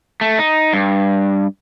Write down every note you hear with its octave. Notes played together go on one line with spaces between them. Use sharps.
A3
D#4
G2